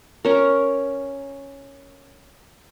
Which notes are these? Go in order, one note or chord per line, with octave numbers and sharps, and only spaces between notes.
C#4 A#4